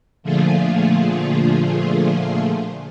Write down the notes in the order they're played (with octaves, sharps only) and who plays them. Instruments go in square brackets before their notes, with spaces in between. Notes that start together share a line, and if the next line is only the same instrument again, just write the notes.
[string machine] A#2 D3 F3 A3 F4 G#4